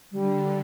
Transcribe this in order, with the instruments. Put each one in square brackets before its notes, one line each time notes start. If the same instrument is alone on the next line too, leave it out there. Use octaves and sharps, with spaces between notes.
[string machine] D3 [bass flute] G3